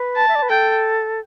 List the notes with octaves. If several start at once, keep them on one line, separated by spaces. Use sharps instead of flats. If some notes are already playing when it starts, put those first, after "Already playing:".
Already playing: B4
A5
E5
D5
B4
A4 G5